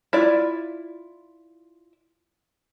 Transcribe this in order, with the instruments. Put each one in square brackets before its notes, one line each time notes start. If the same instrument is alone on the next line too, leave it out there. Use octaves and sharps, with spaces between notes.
[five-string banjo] E4 F4 D5